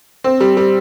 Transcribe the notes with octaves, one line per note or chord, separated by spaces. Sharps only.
C4
G3
G3